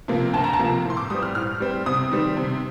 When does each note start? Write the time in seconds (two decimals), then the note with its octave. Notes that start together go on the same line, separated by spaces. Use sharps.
0.08 C3 F3 A#3
0.33 D2 A5
0.44 A#5
0.53 A5
0.59 C3 F3 A#3
0.85 A2
0.90 C6
0.97 D6
1.10 G3 C4 D#6
1.23 F6
1.35 A2 F6
1.60 G3 C4
1.86 C3 D#6
2.11 D#3 G3 C4
2.37 C3